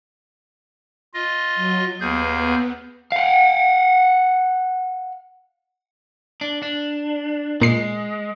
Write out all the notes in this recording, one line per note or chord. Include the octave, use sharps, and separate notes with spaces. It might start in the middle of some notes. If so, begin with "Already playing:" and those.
F4 D#5
F#3
D#2 B3 G#4 G6
F5 F#5
D4
D4
A#2 G#3 C7